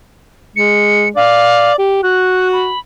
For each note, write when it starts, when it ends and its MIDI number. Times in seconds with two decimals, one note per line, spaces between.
0.56 1.11 56
0.56 1.08 97
1.16 1.76 74
1.16 1.72 77
1.79 2.02 67
2.03 2.71 66
2.03 2.48 90
2.53 2.79 83